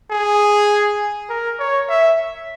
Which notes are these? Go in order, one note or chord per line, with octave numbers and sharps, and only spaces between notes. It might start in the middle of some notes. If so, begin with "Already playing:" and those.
G#4
A#4
C#5
E5